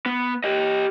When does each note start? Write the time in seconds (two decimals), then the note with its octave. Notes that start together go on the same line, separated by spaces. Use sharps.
0.06 B3
0.44 G4 D#5